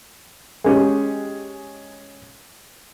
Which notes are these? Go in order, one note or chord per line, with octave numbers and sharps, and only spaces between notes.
G#3 C#4 G4